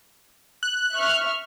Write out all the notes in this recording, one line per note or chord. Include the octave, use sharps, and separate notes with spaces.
F#6
E5 C#6 F6